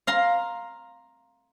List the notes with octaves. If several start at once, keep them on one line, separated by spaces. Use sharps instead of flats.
F5 A#5 C6